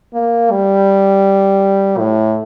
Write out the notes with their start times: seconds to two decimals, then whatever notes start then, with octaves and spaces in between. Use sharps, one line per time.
0.14 A#3
0.51 G3
1.98 A2